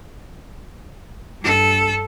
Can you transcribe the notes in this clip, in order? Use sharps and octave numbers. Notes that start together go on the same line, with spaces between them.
G2 A4